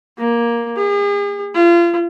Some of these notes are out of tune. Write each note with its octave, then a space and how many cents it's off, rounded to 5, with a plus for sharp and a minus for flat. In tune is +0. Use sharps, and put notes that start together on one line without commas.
A#3 +10
G#4 -40
F4 -35